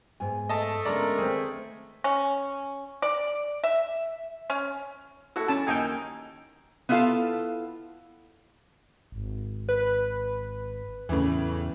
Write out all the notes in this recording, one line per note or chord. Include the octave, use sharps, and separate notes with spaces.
G#2 B3 G#5
A3 D#5 A5
D3 G#3 B3 C#4 A#4 D5 A#5
D#3 C4 G#4
C#4
D5
E5
C#4
E4 F#4 A4
C#4 A5
D#2 D#4 A#4 G5 G#5
B3 E4 F4 A4 F5 A5
G#1
B4
E2 A2 C#3 E3